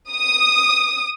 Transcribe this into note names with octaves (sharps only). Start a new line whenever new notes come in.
D#6